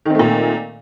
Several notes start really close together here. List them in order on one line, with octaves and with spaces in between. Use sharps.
D#3 C4 A3 A#2